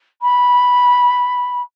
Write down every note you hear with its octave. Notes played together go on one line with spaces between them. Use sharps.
B5